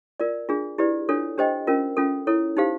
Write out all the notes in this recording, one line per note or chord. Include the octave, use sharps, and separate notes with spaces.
F4 A#4 D5
D4 F4 G#4
E4 G4 B4 D5
D4 F4 A4 C#5
D4 G4 C5 D#5 G5
C#4 F4 A#4
C#4 F4 A4
E4 A4 C#5
D#4 G4 C5 F5